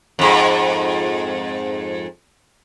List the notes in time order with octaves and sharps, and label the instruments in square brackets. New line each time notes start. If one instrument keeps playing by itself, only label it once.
[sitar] F2 G#2